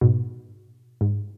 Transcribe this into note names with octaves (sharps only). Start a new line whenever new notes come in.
G#2 B2
G#2